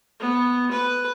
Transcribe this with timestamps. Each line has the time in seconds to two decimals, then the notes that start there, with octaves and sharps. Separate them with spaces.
0.20 B3
0.71 B4